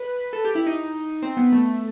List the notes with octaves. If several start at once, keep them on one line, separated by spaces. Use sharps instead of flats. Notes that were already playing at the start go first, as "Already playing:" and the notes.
Already playing: B4
A4
G4
E4
D#4
C4
B3
A3